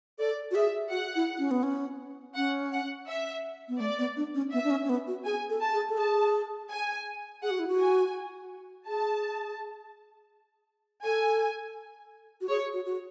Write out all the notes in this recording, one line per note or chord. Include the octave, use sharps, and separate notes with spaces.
A4 D5
F#4
G#4 E5
F#4 F#5
E4
C#4
B3
C#4
C#4 F#5
F#5
E5
B3
A3 D5
B3
D4
C#4
B3 E5
D4
C#4
C#4
B3
F#4
G#4 G#5
A4
A5
G#4
A4
G#4 A5
G#5
G#4 F#5
F#4
E4
F#4
G#5
G#4 A5
A4 G#5
F#4
G#4 C#5
F#4
F#4